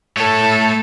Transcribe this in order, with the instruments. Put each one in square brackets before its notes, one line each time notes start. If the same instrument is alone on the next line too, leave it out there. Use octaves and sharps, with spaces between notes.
[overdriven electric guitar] A3 C#5 [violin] A4